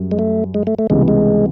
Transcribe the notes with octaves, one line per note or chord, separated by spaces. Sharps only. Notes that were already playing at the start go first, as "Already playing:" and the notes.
Already playing: F#2 G3
G#3
A3
G#3
A3
A3
C#2 C3 E3 G3 G#3 B3
G#3